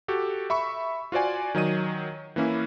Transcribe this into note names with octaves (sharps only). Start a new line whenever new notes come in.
F#4 G4 A4
E5 B5 C#6
F4 F#4 C5 D5 G#5
D#3 F#3 D#5 D#7
E3 A#3 C#4 E4